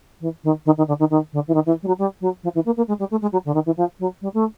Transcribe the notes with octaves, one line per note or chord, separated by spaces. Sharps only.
E3
D#3
D#3
D#3
D3
D#3
D#3
D3
E3
D#3
E3
G3
F#3
G3
F#3
F3
E3
A#3
A#3
G#3
G3
A3
G#3
F#3
D3
D#3
E3
F3
F#3
G3
A3